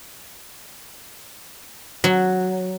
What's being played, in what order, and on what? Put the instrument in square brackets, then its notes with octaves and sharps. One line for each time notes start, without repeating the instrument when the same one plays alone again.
[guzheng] F#3